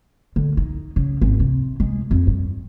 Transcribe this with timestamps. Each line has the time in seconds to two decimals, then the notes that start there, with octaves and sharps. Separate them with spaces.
0.36 D3
0.57 D#4
0.96 C#3
1.21 G#1
1.40 C3
1.80 G#3
2.11 F2
2.27 G2